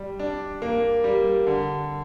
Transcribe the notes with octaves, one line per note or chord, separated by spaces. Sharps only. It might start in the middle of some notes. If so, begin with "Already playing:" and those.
Already playing: G3
D4
A#3
G3
D3